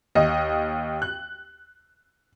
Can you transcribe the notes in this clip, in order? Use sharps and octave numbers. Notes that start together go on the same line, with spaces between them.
D#2 D#5
F#6